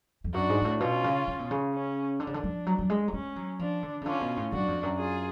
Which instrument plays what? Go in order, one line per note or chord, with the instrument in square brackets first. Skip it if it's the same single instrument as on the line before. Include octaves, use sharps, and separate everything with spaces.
[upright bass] F2
[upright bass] F#2 [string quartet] D4 F#4
[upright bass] G#2
G#2
A2
[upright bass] B2 [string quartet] C#4 F4
[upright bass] C#3
C#3
B2
C#3
[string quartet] C#4
[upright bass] D3 [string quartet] D4
[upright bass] C#3
D3
F3
F#3
F#3
G#3
F#3
[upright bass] G#3 [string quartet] C#4
[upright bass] F#3
[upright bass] F3 [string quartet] D4
[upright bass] D3
C#3
[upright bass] D3 [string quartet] C#4 F4
[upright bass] B2
A2
[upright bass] F#2 [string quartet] D4 F#4
[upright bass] F2
F#2
[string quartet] F4 G#4